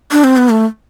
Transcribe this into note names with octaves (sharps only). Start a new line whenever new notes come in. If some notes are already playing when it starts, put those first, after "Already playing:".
D4
C4
B3
A3